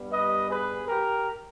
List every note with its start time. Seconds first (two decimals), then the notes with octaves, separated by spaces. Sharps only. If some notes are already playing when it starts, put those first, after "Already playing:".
Already playing: G2 G3 B3
0.10 B4 D#5
0.49 G#4 B4
0.87 G4 A#4